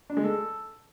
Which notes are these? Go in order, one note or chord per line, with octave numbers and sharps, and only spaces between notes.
D4
G#3
A4